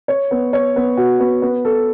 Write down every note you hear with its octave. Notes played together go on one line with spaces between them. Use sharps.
C#5
B3
C#5
B3
F#4
B3
B3
A4